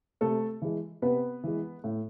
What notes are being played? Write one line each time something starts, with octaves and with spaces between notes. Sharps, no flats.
C3 A3 A4
E3 G#3
C3 B3 B4
E3 G#3
A2